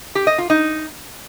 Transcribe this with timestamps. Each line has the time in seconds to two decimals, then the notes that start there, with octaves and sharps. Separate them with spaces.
0.15 G4
0.27 D#5
0.38 F4
0.50 D#4